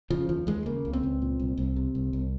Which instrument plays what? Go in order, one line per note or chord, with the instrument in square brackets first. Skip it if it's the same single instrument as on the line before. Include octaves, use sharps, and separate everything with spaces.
[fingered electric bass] C#3 F3
D#2 F3
D#2 G#3
C#3 A#3
C#2
C4
C#2
A#2
C2
C2
C3
C2
C2